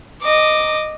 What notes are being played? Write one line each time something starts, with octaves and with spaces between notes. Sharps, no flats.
D#5 D6